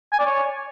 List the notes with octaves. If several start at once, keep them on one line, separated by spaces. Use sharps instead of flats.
G#5
D5
C#5